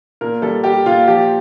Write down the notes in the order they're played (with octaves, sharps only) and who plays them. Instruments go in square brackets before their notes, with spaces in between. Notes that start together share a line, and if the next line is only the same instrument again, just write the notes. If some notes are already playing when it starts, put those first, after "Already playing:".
[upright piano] A#2 A#4
G3 A4
G3 G4
A#2 F4
F3 G4